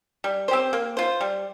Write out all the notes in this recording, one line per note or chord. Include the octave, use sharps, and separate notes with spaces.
G3
C4 G4 C5
A#3
F4 C5
G3